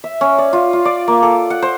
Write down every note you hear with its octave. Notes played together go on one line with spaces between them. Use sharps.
E5
C#4
D5
F4
F4
D5
A#3
A4
F#5
C5